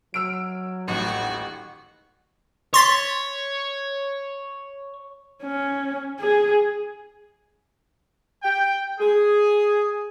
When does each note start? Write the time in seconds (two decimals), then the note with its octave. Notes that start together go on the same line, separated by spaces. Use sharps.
0.14 F#3 E6 F6 D7
0.88 D#1 A1 F#4
2.74 C#5 C6 A6 B6
5.43 C#4
6.20 G#4
8.43 G5
8.99 G#4